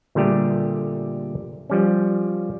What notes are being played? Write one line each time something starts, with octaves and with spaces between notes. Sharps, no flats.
A#2 D3 G3 A3 G4 G#4
F3 G3 C#4